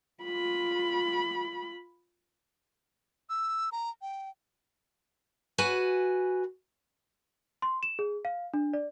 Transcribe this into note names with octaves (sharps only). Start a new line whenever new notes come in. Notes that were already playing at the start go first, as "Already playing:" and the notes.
F4 B5
E6
A#5
G5
F#4 B4 G#5
C6
E7
G#4
F5
D4
D5